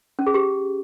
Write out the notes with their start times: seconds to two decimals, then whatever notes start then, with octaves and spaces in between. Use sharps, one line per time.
0.19 C#4
0.26 G#4
0.34 G4